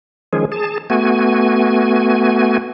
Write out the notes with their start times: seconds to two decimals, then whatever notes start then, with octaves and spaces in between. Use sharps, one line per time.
0.33 D#3 F3 G#3 C#4 G#4
0.52 G#4 A5
0.90 A3 B3 F#4 G#5